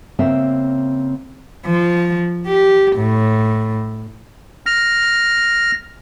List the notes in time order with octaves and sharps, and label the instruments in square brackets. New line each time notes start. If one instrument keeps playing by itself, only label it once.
[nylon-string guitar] C#3 A#3 C4 E5
[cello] F3
G4
A2
[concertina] F6 [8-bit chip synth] A#6